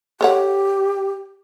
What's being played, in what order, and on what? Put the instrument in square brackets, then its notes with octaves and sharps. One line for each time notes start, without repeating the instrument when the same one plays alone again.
[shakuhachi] G4 [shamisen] A4 C#5 F#5